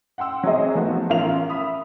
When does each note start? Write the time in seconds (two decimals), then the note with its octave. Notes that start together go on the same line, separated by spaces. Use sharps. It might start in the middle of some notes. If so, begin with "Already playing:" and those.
0.18 F#5 G5 C6 E6
0.44 F#3 G#3 C4 G#4 C#5 D#5
0.75 F3 A3 B3 D#4 F#4
1.10 A1 C#4 F4 A#4 F5 F7
1.50 E5 B5 D#6